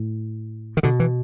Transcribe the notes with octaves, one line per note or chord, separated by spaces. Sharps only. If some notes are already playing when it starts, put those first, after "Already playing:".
Already playing: A2
D#3
B2 D3
E3